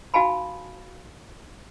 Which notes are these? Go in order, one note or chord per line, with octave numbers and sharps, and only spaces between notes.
D#4 F#4 F5 G#5 A5 B5